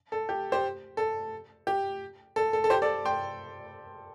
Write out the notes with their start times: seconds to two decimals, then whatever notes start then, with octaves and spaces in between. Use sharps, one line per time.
0.12 A4
0.29 G4
0.52 G4 C5
0.97 A4
1.67 G4
2.36 A4
2.53 A4
2.64 A4
2.70 G4 C5
2.82 A4 D5
3.05 G5 C6